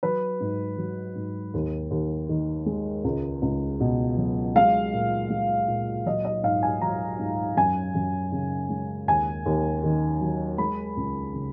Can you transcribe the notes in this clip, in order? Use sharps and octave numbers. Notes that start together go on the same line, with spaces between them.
F#3 B4
G#2
F#3
G#2
D#2
D#2
D#3
G#3
C#2
C#2
B2
F#3
G#3 F5
A#2
G#3
A#2
F#3 D#5
D#5
G#2 F5
G#5
F#3 A#5
G#2
F#2 G#5
F#2
C#3
G#3
D#2 G#5
D#2
D#3
F#3
G#3 B5
C#2
C#3